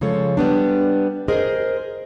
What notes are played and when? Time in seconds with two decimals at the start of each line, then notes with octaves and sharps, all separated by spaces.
0.01 C#3 F3 G#3 A4 C#5
0.37 G3 B3 D4
1.28 G#4 A#4 C5 D#5